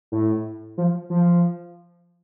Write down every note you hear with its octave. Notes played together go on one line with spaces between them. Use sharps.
A2
F3
F3